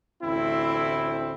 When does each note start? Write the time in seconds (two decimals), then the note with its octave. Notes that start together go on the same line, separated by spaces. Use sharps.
0.22 A1 D2 C4 E4